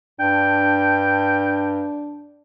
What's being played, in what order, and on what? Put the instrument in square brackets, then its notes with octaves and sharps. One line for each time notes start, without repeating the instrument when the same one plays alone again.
[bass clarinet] G2 [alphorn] D4 [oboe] G5